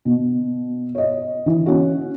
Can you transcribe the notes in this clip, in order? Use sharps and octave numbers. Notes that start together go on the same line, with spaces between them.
B2
C#5 D#5
E3
C#4 F#4